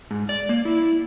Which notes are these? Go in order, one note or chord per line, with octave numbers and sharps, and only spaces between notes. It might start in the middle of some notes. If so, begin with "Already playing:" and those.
G#2
D5
A#3
E4